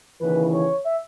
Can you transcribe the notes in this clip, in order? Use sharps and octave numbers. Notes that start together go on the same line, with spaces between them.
D#2 C#3 E3 B4
C#5
E5